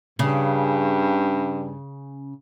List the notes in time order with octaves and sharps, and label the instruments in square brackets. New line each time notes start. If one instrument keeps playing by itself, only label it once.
[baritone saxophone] G2 [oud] C#3